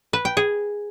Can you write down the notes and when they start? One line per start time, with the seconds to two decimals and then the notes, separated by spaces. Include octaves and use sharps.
0.13 B4
0.25 G5
0.37 G#4